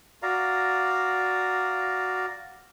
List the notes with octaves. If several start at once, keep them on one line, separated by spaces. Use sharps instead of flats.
F#4 D5 F5 A#5